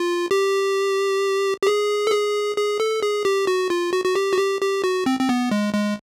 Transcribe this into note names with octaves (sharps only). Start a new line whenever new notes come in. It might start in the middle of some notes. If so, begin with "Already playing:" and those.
Already playing: F4
G4
G4
G#4
A4
G#4
G#4
A4
G#4
G4
F#4
F4
F#4
F#4
G4
F#4
G4
G4
F#4
C4
C4
B3
G#3
G#3